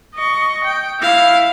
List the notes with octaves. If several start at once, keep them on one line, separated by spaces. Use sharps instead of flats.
D#5 C#6
G5
E4 F5